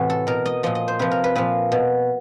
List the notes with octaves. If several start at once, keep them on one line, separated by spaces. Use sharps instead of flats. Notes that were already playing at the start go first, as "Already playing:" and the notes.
Already playing: A2 C3 E3 C4 F#4
A4
B2 A#4
D#5
A#2 F3 D#5
D#5
C5
C3 F3 B4
A#4
B4
A#2 F3 B4
B2